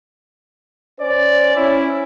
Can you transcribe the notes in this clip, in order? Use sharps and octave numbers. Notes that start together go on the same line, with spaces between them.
C#4 C5 D5
C#4 E4